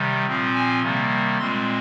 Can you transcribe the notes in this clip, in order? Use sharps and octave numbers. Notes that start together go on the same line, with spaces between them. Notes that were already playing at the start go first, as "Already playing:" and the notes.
Already playing: C3 D#3 G3
A#2 F3 C4
G#5
C3 D#3 G3 A#3
A#2 G#3 C4 C6